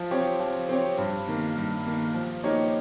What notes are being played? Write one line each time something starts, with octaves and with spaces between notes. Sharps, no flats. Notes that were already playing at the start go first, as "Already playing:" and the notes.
Already playing: F3
C4 G4 C#5
F3
C4 G4 C#5
G2
D#3 A#3
G2
D#3 A#3
F3
A#3 D#4 G4 C#5